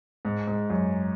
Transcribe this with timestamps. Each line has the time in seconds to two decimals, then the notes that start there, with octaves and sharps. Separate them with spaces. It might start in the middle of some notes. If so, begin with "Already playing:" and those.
0.25 G#2
0.47 G#2
0.70 F#2